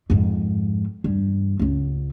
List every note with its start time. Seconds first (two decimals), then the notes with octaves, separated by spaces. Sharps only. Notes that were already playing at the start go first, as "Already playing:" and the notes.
0.10 F2 G#2
1.04 E2 G2
1.59 C#2 C#3